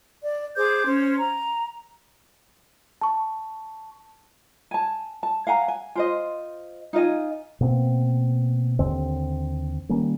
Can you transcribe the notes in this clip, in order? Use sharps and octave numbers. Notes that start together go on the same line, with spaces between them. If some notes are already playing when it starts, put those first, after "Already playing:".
D5
G#4 C5 D6 G6
C#4 C5
A#5
A5 C#6
G#5 A5
A5
F5 F#5 G#5 A#5
G#5
F4 C5 D#5
D#4 F4 D#5 G#5
B2 A#3 C4
D#2 D3 C4
D#3 G3 A#3 C#4